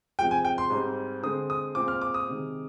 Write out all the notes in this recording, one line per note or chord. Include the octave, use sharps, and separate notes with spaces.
C3 F3 G#3 G5
G#5
G5
C6
G#2 G3 C4
D3 G#3 C4 D#6
D#6
A#2 G#3 C4 D6
F6
D6
D#6
C3 D#3 G#3